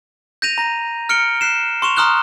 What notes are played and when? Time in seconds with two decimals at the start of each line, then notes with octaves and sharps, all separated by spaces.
0.42 G6 A#6 D#7 F7
0.58 A#5 A#6
1.09 F6 C#7 D7 G7
1.41 F#6 C7 E7
1.82 C6 C#6 E7 F7
1.96 A#5 C6 D#6 F6 F#6 G7